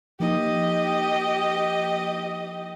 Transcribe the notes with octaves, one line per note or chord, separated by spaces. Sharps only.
F3 A#3 D#4 G4 D#5